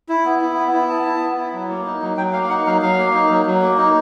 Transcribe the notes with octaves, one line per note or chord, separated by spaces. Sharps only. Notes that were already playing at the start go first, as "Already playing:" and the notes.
E4
B3
E4
B3
E4
B3 A5
E4
B3
E4
F#3
A#3
D#4
F#3
F#3 G5
A#3 F5
F5
D#4 F#5
F#3 F5
F#3 F5
A#3
D#4
F#3
F#3
A#3
D#4